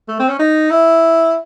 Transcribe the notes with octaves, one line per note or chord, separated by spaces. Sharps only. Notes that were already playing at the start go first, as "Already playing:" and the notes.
A3
C4
C#4
D#4
E4